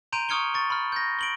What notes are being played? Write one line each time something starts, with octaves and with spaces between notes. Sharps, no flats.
A#5 C6 G6 D7 D#7 F7
C#6 D#6 F6 G#6 C#7 G7
C#6 A6
B5 F6
G6 A#6
D7 F#7 G7